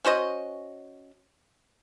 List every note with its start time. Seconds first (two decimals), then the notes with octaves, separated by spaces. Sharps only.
0.05 C#4 F#4 C5 D#5